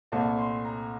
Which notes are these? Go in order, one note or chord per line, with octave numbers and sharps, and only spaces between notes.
C2 A#2 A3 C4 A5
C6
A#5